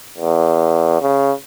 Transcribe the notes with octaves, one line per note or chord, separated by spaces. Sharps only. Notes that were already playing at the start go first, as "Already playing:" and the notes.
E2
C#3